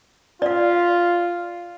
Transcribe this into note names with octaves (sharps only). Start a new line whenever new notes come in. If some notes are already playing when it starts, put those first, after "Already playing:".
F4 D5 F5